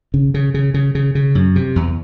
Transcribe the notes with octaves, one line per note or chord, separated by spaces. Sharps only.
C#3
C#3
C#3
C#3
C#3
C#3
F#2
C3
E2